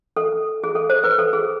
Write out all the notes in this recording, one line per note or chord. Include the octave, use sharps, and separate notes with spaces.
A4
G#4
A4
C5
B4
A4
G#4